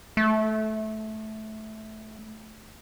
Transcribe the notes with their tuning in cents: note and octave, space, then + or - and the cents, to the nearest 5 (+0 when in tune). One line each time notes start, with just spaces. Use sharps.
A3 -15